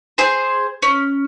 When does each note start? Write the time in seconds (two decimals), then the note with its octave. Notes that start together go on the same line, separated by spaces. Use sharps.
0.18 G#4 C5
0.82 C#4